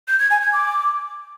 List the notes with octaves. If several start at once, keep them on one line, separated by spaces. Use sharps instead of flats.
G6
G#6
G#5
G#6
D6